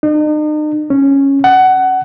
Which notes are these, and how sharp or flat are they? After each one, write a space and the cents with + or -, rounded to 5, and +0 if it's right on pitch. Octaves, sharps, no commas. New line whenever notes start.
D#4 -40
C#4 -5
F#5 +20